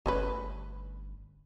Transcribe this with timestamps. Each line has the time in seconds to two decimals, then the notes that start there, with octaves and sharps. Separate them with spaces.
0.06 G1 A3 C#4 B4